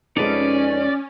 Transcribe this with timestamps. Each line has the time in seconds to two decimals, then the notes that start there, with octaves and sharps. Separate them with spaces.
0.17 F2 G#3 C#4 D#4 A4 B4 D5